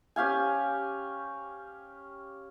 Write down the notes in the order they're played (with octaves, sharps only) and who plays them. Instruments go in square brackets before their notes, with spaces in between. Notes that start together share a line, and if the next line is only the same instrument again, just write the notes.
[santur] C#4 G4 F5 G#5